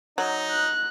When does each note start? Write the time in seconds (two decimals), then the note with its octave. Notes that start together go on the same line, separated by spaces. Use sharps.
0.18 F#3 D#4
0.51 F#6